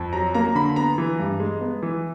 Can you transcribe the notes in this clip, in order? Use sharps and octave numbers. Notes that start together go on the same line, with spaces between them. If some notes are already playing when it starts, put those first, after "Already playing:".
Already playing: F2
F#3 A#5
A#3 A#5
A#5
D3 B5
B3 A#5
E3
G2
G#3
B3
E3